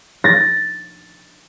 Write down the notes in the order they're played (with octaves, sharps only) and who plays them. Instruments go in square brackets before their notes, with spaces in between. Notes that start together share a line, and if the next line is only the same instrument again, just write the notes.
[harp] A6 A#6